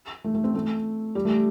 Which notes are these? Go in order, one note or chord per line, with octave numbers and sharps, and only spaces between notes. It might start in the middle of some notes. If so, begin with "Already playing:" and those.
A3
A3
C4
A3
G3
A3